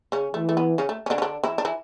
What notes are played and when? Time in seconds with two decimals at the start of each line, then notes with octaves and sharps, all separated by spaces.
0.12 C#3 C#4
0.34 E3 A3
0.49 A3
0.57 B3
0.78 C#3 C#4
0.89 A3
1.06 C#4
1.10 D3 D4
1.18 C#4
1.22 D3 D4
1.43 E3 E4
1.58 D4
1.65 E3 E4